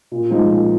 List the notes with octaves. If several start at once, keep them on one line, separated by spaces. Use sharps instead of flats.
A#2
F3 G#3 D#4
A#2